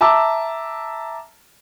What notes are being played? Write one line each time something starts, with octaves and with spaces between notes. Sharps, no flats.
E5 A5 A#5 D6 E6